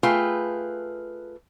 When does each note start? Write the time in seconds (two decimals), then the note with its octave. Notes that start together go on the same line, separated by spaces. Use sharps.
0.03 A3 F4 G#4 B4 G5